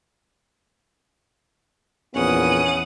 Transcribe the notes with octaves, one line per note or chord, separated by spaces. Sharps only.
A#1 E2 B3 C#4 F#5 D#6